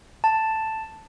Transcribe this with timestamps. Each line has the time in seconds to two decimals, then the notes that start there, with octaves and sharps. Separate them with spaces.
0.24 A5